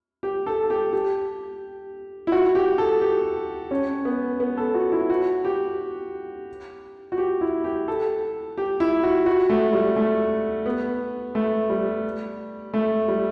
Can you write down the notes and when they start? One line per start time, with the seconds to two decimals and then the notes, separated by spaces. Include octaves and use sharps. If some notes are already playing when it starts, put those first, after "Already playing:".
0.23 G4
0.46 A4
0.63 A4
0.70 G4
0.93 G4
2.27 E4
2.32 F#4
2.55 G4
2.78 A4
3.01 G4
3.71 C#4
4.05 B3
4.40 B3
4.57 A4
4.74 F#4
4.92 E4
5.10 F#4
5.45 G4
7.12 F#4
7.18 G4
7.41 E4
7.64 G4
7.88 A4
8.58 G4
8.80 E4
9.03 F#4
9.26 F#4
9.50 A3
9.73 G3
9.96 A3
10.66 B3
11.35 A3
11.69 G3
12.74 A3
13.08 G3